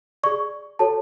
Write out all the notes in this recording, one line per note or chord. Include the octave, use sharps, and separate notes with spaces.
G#4 D5 C#6
F#4 A4 C#5 A5